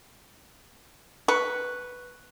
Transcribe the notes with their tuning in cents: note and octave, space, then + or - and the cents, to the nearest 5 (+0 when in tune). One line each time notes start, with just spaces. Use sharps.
B4 +0 C#6 +0